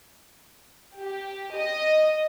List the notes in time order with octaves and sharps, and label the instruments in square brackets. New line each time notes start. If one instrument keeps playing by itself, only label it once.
[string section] G4
D#5